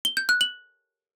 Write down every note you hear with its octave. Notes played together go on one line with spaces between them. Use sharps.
G7
G6
F#6
F#7